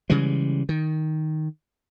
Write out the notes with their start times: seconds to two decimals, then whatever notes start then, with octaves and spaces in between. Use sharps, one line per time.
0.10 C#3 E3 G3 G#3
0.69 D#3